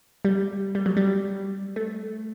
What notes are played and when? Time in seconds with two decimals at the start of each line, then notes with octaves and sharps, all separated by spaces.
0.25 G3
0.75 G3
0.86 F#3
0.97 G3
1.76 A3